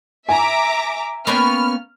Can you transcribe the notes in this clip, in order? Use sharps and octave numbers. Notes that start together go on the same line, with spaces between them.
E5 G#5 A#5 D6
A#3 B3 C#4 G5 B5 C#6 F6